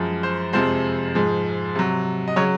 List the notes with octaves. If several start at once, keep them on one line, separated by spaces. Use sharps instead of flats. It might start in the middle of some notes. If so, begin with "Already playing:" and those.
Already playing: F#2 F3 G#3
C5
F2 C3 F3 G#3 C5
G#2 F3 G#3
C3 F#3
D#5
C#3 F#3 C#5